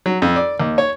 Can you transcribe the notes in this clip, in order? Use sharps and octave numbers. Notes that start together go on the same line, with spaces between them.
F#3
F2
D5
D#2
C#5